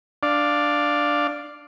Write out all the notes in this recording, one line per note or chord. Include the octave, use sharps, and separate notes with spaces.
D4 D5 F5